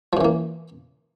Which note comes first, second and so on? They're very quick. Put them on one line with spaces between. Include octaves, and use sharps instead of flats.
F3 F#2 E3 A#3